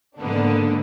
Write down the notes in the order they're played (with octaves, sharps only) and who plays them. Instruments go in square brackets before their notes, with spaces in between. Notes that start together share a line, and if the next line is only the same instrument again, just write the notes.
[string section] G#2 D3 A#3 B3 D4